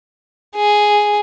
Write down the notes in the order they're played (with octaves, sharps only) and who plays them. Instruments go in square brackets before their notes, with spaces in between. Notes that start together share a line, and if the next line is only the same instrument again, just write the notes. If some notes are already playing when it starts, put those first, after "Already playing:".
[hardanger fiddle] G#4